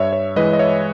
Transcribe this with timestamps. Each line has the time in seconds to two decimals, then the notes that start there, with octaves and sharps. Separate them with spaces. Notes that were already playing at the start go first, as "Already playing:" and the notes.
Already playing: G2 C#5 E5
0.13 C#5
0.36 E3 G#3 B4 D#5
0.53 D#5
0.59 C#5 E5